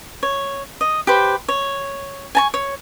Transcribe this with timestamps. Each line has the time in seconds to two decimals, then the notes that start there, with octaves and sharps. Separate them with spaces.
0.23 C#5
0.81 D#5
1.07 G4 B4 C5
1.48 C#5
2.35 G#5 A5 C#6
2.54 C#5